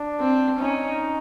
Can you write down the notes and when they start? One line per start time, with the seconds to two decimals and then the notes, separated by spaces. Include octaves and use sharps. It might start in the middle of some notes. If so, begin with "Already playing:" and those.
Already playing: D4
0.20 C4
0.60 C#4 D#4